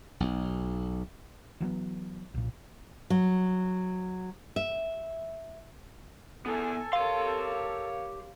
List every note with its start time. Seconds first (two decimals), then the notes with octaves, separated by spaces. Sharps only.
0.20 B1
1.60 E3 F#3 G#3 B3
2.34 B1 A#2
3.10 F#3
4.56 E5
6.46 B3 E4 A4 G#5
6.93 G4 A#4 C#5 F5 C6